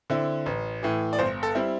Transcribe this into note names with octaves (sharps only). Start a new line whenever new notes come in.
D3 C4 E4
A1
A2 E3
D5
G1 C5
A4
G3 C4 E4